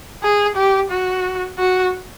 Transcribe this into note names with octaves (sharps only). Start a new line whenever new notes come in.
G#4
G4
F#4
F#4